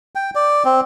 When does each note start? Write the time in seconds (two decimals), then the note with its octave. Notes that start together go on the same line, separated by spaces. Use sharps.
0.15 G5
0.35 D5
0.65 C4